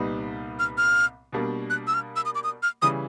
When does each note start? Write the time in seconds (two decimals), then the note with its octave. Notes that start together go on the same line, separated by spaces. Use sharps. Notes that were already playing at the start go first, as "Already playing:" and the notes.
Already playing: C2 A#2 G3 B3 D#4
0.59 F6
0.78 F6
1.32 B2 G3 A#3 D4
1.70 F#6
1.87 E6
1.94 F6
2.16 E6
2.25 D#6
2.35 D6
2.44 D#6
2.63 F6
2.82 C#3 E3 G3 D#6